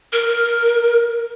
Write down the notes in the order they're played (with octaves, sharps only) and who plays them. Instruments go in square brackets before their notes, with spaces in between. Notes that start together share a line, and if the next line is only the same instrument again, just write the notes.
[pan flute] A#4